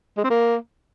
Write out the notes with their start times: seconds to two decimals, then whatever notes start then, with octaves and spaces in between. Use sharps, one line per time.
0.17 G#3
0.24 C4
0.30 A#3